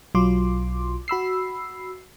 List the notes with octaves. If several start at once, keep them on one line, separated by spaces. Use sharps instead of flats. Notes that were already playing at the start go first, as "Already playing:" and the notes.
B1 F#3 F4 C6 D6
F#4 B5 E6 C7